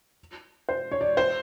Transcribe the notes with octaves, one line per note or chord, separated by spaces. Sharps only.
C5
C#5
D5
C5